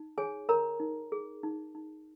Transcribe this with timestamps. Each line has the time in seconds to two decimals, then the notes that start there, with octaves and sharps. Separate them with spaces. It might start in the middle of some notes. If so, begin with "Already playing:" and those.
Already playing: D#4
0.18 G#4 C#5 G#5
0.49 A#4 C#5 A#5
0.80 D#4
1.12 G#4
1.43 D#4
1.75 D#4